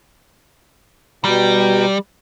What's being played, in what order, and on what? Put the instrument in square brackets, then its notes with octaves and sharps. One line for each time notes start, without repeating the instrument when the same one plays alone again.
[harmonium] B2 G5 A#5 [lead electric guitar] G3